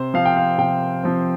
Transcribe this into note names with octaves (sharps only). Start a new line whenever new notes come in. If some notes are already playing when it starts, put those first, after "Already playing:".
Already playing: C3 C5
F3 C4 F5
G5
F5
C3 G5
F3 C4